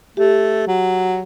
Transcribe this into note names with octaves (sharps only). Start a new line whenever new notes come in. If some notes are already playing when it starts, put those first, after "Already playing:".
A3 G4
F#3